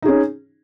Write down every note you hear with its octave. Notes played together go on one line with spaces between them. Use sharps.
C#4 D#4 G#4